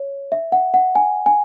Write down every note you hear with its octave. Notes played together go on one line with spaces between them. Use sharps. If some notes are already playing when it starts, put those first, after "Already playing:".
Already playing: C#5
E5
F#5
F#5
G#5
G#5